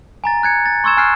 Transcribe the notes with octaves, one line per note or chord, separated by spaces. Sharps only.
G#5 A#5 A6
F#6 G#6 C#7
A6
C6 C#6 E6 G#6 E7
G#5 F6 F#6 C7